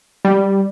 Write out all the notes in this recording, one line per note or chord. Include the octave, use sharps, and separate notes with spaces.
G3